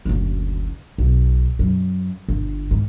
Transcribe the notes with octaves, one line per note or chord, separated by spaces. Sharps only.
F#1 D2
B1
F#2
G1
G#2